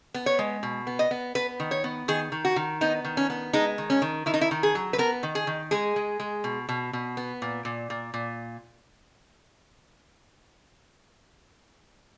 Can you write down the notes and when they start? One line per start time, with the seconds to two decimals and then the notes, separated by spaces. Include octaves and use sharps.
0.14 B3
0.26 C#5
0.39 G#3
0.63 B2
0.87 B3
0.99 D#5
1.11 B3
1.35 B3 B4
1.60 D#3
1.71 C#5
1.84 B3
2.08 D#3 G#4
2.32 D#3
2.45 F#4
2.56 D#3
2.81 B3 D#4
3.05 D#3
3.17 C#4
3.30 B3
3.53 G#3 D#4
3.78 D#3
3.90 C#4
4.02 D#3
4.26 D#3 E4
4.34 D#4
4.41 E4
4.51 D#3
4.63 G#4
4.75 F#3
4.93 B4
4.98 B3 A#4
5.23 D#3
5.35 G#4
5.47 D#3
5.71 G#3 G#4
5.96 G#3
6.20 G#3
6.44 B2
6.69 B2
6.93 B2
7.17 B3
7.42 A#2
7.65 A#2
7.90 A#2
8.14 A#2